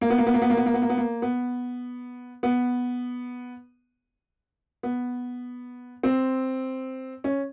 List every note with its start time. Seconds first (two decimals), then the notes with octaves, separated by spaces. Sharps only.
0.01 A#3
0.10 B3
0.18 A#3
0.26 B3
0.34 A#3
0.42 B3
0.50 A#3
0.57 B3
0.66 A#3
0.74 B3
0.82 A#3
0.90 B3
0.97 A#3
1.22 B3
2.43 B3
4.83 B3
6.03 C4
7.24 C#4